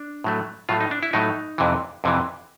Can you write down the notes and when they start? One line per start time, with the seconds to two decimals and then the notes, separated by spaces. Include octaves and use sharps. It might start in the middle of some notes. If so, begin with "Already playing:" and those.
Already playing: D4
0.24 A2 F#3 A3
0.69 A2 F#3 A3 F4
0.80 D#4
0.91 D4
1.03 E4
1.13 A2 F#3 A3 D#4
1.58 F2 C3 E3
2.04 F2 C3 E3